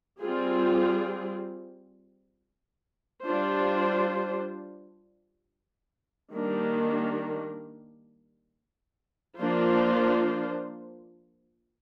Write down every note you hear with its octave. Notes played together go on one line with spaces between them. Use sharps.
G3 C4 F4 G#4
G3 D4 F4 C5
D#3 G3 A#3 D4
F3 A#3 D4 F4 C5